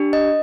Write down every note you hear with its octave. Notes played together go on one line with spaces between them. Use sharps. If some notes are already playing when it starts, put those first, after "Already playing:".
Already playing: D4 G4
D#5